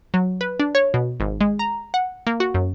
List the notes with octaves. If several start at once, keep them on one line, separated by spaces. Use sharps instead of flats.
F#3
B4
D4
C#5
B2
G#1
G#3
A#5
F#5
A#3
F#4
F#2